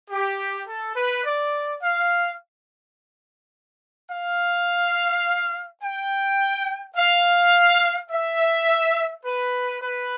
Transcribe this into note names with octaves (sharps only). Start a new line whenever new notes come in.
G4
A4
B4
D5
F5
F5
G5
F5
E5
B4
B4